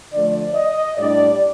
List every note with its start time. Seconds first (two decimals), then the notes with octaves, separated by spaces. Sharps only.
0.13 D3 F3 A3 D5
0.55 D#5
0.98 A2 G3 D4 D5